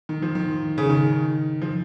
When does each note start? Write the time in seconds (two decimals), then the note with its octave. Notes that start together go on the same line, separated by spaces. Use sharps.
0.09 D#3
0.22 F3
0.35 D#3
0.78 C#3
0.90 D#3
1.61 F3